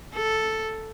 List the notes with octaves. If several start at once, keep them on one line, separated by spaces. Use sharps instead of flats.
A4